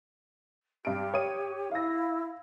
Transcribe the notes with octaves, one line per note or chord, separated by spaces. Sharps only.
G2 G4 D7
C#5 D#6 D#7
E4 F5 A#6